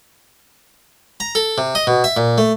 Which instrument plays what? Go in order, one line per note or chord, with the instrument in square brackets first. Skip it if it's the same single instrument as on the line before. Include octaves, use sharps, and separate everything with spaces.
[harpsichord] A#5
A4
C3
D#5
B2
E5
A#2
A3